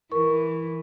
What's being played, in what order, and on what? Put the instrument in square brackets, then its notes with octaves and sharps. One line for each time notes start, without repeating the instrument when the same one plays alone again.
[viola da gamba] E3 [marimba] A#4 C#6